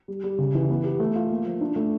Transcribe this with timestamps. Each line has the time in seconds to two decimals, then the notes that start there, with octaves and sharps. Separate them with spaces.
0.08 G3
0.24 G3
0.38 C#3
0.55 E3
0.70 B3
0.84 G4
1.00 A3
1.15 F4
1.30 A#3
1.46 F3
1.61 D4
1.76 A3